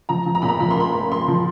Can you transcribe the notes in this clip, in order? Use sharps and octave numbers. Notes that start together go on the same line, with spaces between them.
F3 A#5
F3
A#5
A#2 B5
A#5
F3 B5
C6
A#3 B5
A#3
A#3 C6
F3